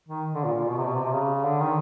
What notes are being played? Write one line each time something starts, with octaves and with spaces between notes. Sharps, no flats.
D#3
D3
A#2
A#2
B2
C3
B2
C3
C3
C#3
D3
D#3